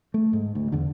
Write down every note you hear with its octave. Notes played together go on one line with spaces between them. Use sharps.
A3
G#2
D2
E2 D3